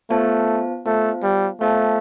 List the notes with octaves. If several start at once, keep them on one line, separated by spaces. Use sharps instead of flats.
A3 B3 F4 C5 F5 A5
A3 B3 F4 C5 F5 A5
G3
A3 B3 F4 C5 F5 A5